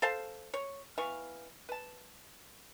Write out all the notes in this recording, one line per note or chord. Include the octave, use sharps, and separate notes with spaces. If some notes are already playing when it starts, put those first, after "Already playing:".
A4 C5 F5 A5
C#5
E3 B3 F5 C#6
B4 A5